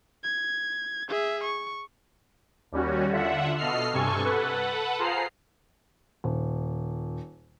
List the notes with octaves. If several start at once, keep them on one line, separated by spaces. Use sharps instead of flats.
G#6
G#4 E5
C#6
D#2 G3 C#4 F#4
D3 F4 E5 F#5
B2 A4 D#5 F6 C7
G2 C3 A4 G#5 C#6
A4 B4 F#5
F4 G#4 C5 A#5 C7
D#1